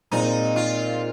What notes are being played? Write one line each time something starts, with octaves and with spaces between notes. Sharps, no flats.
A#2 G#3 C4 D#4
F4